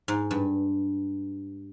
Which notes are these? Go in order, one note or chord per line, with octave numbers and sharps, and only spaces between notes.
G#2
G2